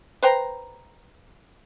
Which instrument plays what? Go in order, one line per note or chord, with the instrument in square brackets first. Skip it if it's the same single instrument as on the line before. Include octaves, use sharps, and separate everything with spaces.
[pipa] B4 C5 G5 A#5